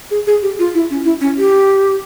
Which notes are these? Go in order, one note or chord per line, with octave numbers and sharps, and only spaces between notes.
G#4
G#4
G4
F4
E4
C#4
E4
C#4
G4